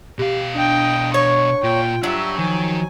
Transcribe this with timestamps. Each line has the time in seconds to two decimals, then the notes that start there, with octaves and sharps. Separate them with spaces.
0.19 B2 G4 F5
0.55 D4 D#5 G5
1.14 C#5 C#6
1.64 A#2 F4 G5
2.03 F#3 D4 G4 E5
2.38 D#3 F3 G#5